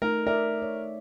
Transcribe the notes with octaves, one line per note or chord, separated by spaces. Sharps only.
A3 D#4 A#4
A#4 D5 E5
C#5